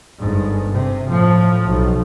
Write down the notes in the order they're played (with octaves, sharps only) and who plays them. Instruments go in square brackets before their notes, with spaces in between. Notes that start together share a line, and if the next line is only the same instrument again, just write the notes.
[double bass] G1 G#2
C3
A2 F3
B1